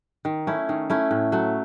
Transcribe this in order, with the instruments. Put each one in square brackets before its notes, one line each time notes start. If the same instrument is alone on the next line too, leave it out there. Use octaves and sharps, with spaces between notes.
[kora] D#3
A3 C#4 E4
D#3
A3 C#4 E4
A2
F#3 A3